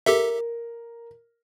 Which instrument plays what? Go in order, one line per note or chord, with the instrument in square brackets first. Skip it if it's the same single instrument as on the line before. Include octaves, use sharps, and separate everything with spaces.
[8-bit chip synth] G4 A4 E5 [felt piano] A#4